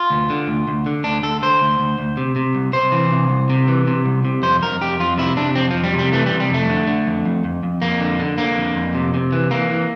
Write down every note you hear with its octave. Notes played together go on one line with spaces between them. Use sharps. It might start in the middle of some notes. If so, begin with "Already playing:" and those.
Already playing: F4
D2
D3
D2
D2
D3
D2 D4
D2 A4
D3 C5
D2
D2
D2
C3
C3
C2
C3 C5
E3
C3
C2
C3
E3
C3
C2
C3
F2 C5
F2 A#4
F2 G4
F2 F4
C3 E4
C3 D4
F2 C4
F2 F3
G3
C3 G3
E3 A3
G3
C3
G3
F2 A3
D3
D3
F2
F2
F2
F2
F2 A#3
D3
D3
D3 A#3
F2
F2
C3
C3
E3
E3 A#3
E3